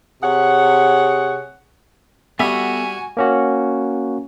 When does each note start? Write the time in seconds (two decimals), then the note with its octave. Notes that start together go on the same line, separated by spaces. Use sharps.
0.23 C3 G#4 C#5 F#5
2.40 G3 B3 F#4 A4 E5 G#5
3.17 A#3 C#4 F#4